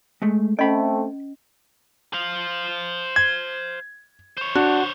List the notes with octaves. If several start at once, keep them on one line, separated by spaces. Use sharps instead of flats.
G#3 A3
A3 C4 C#4 D#5 G5 B5
C5 F5
G#6
C5 C#5
D4 F#4